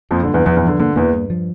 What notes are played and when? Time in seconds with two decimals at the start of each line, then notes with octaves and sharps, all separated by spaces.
0.11 F2 F3 A#3
0.23 D3
0.28 G2
0.34 E2 E3
0.45 E2 E3 F3
0.57 E2 E3
0.62 G2
0.68 D3
0.79 D3 A#3
0.96 E2 E3 A#3
1.13 G2
1.30 F3